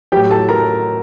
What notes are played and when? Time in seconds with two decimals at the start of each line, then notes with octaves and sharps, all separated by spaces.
0.12 F#3 G4 G5
0.16 A2
0.30 A4 A5
0.49 A#4 A#5